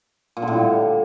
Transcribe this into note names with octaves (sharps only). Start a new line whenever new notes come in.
A#2
D3
A2
G3